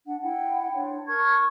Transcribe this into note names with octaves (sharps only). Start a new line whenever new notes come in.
D4 F#5
E4 F#5 G5
D4 C5 C#5
A#4 A5 C#6 G#6